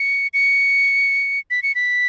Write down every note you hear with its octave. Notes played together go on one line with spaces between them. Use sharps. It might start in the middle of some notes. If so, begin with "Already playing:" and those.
Already playing: C#7
C#7
B6
C#7
B6